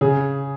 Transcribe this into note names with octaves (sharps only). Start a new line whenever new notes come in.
C#3 G#4